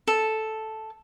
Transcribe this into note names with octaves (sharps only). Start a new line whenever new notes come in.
A4